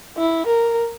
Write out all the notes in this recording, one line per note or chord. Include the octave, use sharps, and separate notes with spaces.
E4
A#4